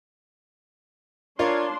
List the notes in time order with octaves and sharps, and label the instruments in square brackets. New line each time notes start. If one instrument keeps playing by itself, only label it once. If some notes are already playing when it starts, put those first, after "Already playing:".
[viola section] D4 C6 [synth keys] F4 G#6 [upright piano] A#4 C#5 D5